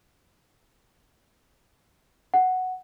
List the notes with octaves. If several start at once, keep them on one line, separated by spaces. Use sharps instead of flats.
F#5